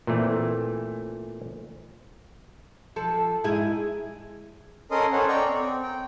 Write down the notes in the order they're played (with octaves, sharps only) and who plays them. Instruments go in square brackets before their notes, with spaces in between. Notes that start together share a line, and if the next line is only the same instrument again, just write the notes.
[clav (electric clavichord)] A#2 E3 A3 C4
[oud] F3 A4
G#2 E4 G#4
[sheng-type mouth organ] C#4 A4 A#4 D#5 C6 D#6
C#4 A4 C5 C#5 F#5
D5 D#5 G5 A#5 C#6
C4
G5